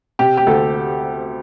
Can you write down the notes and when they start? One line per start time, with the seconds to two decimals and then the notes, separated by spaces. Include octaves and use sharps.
0.19 C3 G4
0.37 G4
0.47 D2 A4